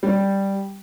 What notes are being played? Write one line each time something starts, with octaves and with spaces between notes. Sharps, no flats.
G3